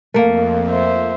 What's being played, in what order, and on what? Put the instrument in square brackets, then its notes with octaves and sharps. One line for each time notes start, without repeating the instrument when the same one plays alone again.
[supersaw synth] F2 [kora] A3 A#3 [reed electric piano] A#4 F5
[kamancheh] C5 E5